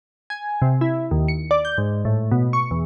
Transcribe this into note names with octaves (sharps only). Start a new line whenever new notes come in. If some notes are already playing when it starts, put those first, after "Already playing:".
G#5
C3
E4
D#2
C#7
D5
G6
G#2
A2
B2
C#6
E2